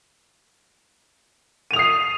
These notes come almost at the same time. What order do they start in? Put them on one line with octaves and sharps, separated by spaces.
D#7 F7 D#6 C7